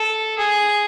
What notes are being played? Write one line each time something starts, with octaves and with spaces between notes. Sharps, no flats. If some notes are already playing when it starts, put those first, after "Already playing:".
Already playing: A4
G#4